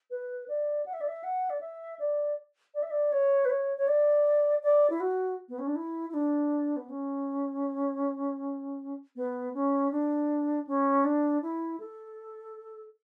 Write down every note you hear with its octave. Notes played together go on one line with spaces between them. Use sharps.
B4
D5
F#5
E5
D5
E5
F#5
D5
E5
D5
D5
E5
D5
C#5
B4
C#5
C#5
D5
D5
E4
F#4
B3
C#4
D4
E4
E4
D4
B3
C#4
B3
C#4
D4
C#4
D4
E4
A4